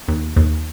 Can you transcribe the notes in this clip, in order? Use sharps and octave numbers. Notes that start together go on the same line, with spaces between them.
D#2
D#2